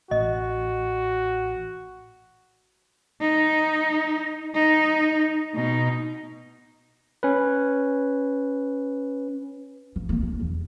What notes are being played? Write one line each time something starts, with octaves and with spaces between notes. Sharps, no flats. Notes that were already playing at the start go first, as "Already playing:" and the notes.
A1 F#4 D#5
D#4
D#4
B2 D#4
C#4 B4
F3
D#3 A#3
C#4 D4
E2